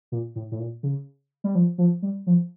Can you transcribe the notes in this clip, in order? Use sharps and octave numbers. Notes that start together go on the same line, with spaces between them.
A#2
A2
A2
A#2
C#3
G3
F3
F3
G3
F3